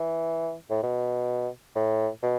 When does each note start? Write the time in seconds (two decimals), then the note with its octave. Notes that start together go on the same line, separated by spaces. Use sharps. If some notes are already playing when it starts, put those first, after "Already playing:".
Already playing: E3
0.70 A2
0.83 B2
1.75 A2
2.23 B2